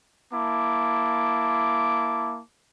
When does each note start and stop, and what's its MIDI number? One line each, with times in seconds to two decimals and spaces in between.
0.33 2.41 58
0.33 2.41 64
0.33 2.41 81
0.33 2.41 86